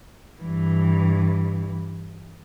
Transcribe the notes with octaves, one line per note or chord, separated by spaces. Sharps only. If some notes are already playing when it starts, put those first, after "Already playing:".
G2 E3